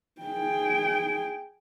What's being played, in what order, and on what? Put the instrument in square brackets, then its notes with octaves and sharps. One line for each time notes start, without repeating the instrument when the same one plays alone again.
[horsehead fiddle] G#4 G5